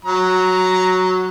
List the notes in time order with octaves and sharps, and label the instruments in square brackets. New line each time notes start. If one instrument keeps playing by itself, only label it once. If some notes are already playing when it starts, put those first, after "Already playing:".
[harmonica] F#3 A#5